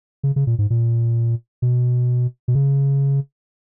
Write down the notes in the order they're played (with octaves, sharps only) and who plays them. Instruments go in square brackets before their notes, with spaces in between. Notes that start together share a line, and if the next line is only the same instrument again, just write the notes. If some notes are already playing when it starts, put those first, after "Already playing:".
[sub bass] C#3
C#3
A#2
G#2
A#2
B2
B2
C#3